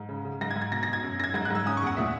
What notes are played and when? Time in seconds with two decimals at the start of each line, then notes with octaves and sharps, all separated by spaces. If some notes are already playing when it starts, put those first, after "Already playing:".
Already playing: G#2
0.09 C#3
0.25 C#3
0.41 G#2 A#6
0.51 G#6
0.56 G#2
0.61 G#6
0.71 B2 A#6
0.83 A#6
0.88 B2
0.93 G#6
1.03 F#2
1.19 F#2 A#6
1.24 G#6
1.34 G#2 G#6
1.45 F#6
1.50 G#2 E6
1.66 C#4 D#6
1.77 C#6
1.82 E2 F#5
1.97 A#2 E5